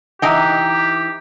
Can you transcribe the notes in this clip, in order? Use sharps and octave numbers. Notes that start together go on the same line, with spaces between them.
E3 D#4 G4 G5